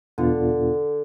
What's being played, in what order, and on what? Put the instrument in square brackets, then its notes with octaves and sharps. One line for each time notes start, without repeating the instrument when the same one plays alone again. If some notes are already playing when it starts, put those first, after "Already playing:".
[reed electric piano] E2 B2 B3 D4 F4 [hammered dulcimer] D3